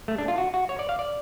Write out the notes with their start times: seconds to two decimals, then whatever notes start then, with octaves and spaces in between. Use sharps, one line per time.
0.08 A3
0.18 D4
0.28 F4
0.38 F#4
0.54 F#4
0.69 C#5
0.79 D5
0.89 F5
0.99 D5